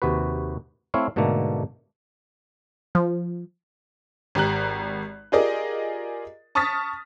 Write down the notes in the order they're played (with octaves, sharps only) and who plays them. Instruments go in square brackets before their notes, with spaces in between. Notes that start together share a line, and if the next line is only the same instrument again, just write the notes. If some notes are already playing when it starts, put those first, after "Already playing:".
[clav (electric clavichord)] D#2 C3 F#4 B4
A3 C4 E4 C#5 F5
G#2 B2 D3 A3 A#3
[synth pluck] F3
[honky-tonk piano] G#1 G4 A#5 F#6
F4 G4 G#4 A#4 D5 D#5
A5 C#6 D#6 F6 A6 B6